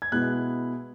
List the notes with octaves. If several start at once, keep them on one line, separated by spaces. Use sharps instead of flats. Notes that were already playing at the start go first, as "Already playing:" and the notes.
G#6
B2 G#3 B3 E4 F#6